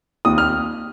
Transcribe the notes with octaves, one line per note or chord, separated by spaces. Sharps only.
D#2 D#6
F6